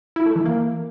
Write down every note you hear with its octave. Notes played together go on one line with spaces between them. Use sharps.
E4
A3
E3
A#3